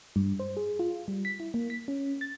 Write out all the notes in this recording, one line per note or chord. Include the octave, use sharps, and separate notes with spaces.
G2
C5
G#4
F4
G3
B6
E4
A#3
B6
C#4
A6